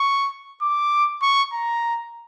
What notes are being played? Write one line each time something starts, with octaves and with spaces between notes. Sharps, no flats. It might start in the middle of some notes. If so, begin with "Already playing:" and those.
Already playing: C#6
D6
C#6
A#5